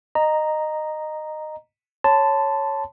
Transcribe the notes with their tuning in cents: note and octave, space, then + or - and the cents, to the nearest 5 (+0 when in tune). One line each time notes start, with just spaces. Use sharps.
D#5 -15 A#5 +0
C#5 +0 A5 +0 C6 -40